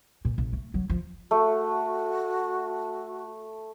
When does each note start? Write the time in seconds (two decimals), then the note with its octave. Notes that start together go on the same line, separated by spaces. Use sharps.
0.25 A#2
0.38 A#1
0.53 A3
0.74 F#3
0.90 F3
1.31 A3 F#4